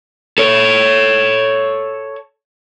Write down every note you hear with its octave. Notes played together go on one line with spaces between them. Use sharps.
A4 C#5